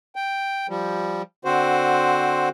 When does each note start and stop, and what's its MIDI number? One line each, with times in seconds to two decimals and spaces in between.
0.16 0.67 79
0.69 1.22 53
0.69 1.22 55
1.45 2.49 50
1.45 2.49 60
1.45 2.49 66
1.45 2.49 72